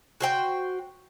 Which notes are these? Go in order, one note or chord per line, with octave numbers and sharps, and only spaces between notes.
F#4 C5 G5